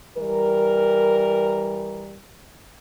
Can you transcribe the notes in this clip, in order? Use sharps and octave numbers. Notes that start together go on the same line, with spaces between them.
E3 G3 A#4